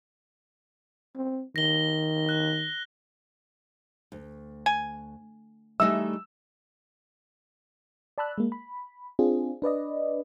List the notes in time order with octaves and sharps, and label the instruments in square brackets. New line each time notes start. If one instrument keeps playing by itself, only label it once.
[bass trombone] C4
[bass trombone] D#3 [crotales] A#6 G7
[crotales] F#6
[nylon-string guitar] D2
[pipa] G#5
[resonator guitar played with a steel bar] E3 D#4 E5 [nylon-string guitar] G3 A3 G#4 [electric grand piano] E6
[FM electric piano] D5 A5 B5 E6 F#6
G#3 A#3
B5
C4 D4 F4 G#4
D4 B4 D5 D#5